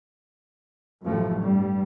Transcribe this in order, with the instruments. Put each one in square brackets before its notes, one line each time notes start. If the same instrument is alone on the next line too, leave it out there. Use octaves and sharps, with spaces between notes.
[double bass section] A1 F#2 A2 C3 F3 A3
G2 G3